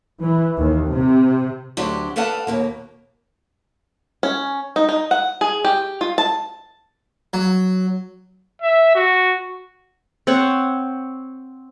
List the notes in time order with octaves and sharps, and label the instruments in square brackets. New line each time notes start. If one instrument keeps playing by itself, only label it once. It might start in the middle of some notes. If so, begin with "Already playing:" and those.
[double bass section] E3
D#2
C3
[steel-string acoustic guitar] D2 F#3 D4 F#4 G4
A4 B4 D5 F5 F#5 A5
D#2 B2 A#3
[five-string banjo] C#4
D#4
D#4
F#5
G#4
G4
F4
A5
[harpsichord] F#3
[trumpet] E5
F#4
[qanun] C4 C#5 F#5